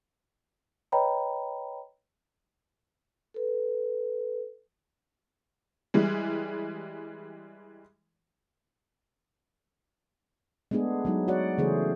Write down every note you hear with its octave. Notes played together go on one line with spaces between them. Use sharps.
B4 C#5 D#5 G5 A#5 B5
A4 B4
E3 G3 G#3
G#3 A3 B3 D4 G#4
F#3 G#3 D#4
F#4 C#5 D5 F#5
C#3 E3 A3 C#4 G#4 C5